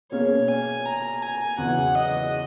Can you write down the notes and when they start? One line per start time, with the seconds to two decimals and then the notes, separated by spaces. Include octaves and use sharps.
0.11 B2 A#3 C#4 G#4 C#5
0.48 G#5
0.85 A#5
1.22 G#5
1.58 E2 C#3 F#3 F#5
1.95 D#5